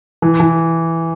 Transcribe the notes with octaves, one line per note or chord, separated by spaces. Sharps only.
E3
E3